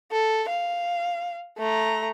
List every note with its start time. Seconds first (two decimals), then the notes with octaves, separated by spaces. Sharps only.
0.12 A4
0.49 F5
1.58 A3 A#5